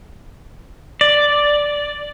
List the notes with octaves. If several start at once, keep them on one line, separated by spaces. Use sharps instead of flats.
D5